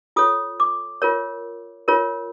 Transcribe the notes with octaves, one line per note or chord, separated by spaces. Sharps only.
F4 A4 C#5 D#6
D6
F4 A#4 C#5
F4 A#4 C#5